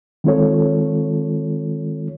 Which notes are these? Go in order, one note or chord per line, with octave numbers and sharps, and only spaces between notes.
D#3 G#3 C4 F4 A4 C#5